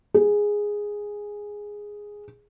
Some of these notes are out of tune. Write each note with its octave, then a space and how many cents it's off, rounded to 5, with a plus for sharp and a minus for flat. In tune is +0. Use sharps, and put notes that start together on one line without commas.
G#4 -5